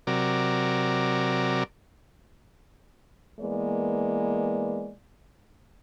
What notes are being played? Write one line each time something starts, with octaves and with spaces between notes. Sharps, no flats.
C3 F#3 A#4 D5
E3 G#3 A#3 B3 D5